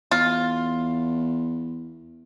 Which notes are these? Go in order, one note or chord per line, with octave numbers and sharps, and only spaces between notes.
E2 F4